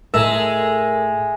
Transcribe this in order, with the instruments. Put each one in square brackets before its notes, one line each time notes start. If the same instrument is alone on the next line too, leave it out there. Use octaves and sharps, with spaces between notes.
[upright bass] A2 [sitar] G#3 [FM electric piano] A4 A#4 [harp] E5